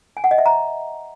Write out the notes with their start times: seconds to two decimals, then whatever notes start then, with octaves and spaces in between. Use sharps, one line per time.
0.17 G#5
0.24 F#5
0.31 D#5
0.38 E5
0.46 A#5